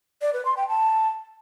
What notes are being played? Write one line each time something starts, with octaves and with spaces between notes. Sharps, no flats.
D5
B4
C6
G5
A5